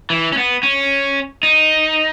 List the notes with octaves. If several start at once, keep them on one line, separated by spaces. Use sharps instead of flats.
E3
C#4
B3
C#4
D#4